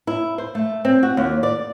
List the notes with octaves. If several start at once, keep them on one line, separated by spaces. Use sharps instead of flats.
E4
C5
A3
C4
F#4
D#2
D5